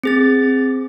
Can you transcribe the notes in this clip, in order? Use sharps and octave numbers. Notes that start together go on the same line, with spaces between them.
C4 G#4 A6